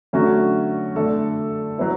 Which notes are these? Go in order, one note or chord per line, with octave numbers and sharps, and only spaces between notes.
D3 F#3 A3 C#4 F#4
D3 A3 D4 A4
F#3 B3 E4